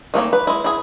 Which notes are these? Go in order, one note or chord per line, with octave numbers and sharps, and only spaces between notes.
D#3 A3 A#3 C#5
B4
G#3 E4
E4 G#4